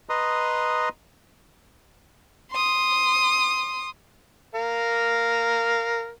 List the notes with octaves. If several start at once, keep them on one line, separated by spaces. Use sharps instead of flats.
B4 D#5 A#5 C6 D#6
C6 D#6
A#4 F5